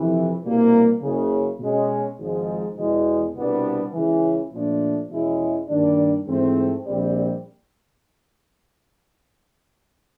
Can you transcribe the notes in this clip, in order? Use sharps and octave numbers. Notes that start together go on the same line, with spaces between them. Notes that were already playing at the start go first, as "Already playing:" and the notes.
Already playing: F2 C3 E3
C2 B2 G3 A#3
F#1 F#2 C#3
B2 G#3 C#4
G#1 G#2 F3 G#3
E2 B2 G#3
C2 B2 G3 B3 D4
C#2 C#3 E3
A#2 F3 A3 D4
E2 B2 G#3 C#4 E4
G2 D#3 G3 A#3 D4
G#2 E3 A3 C4
A#1 A#2 G3 C4